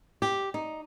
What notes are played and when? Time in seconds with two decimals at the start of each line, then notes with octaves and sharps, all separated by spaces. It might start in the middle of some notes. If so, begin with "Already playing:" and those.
0.22 G4
0.54 D#4